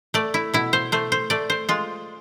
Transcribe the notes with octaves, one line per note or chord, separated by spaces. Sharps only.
A3 D5
E4
B2 E4
C5
A3 C5
C5
A3 D5
C5
G#3 F4